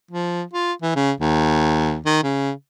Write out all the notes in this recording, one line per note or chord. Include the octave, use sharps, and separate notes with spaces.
F3
F4
E3
C#3
D#2
D#3
C#3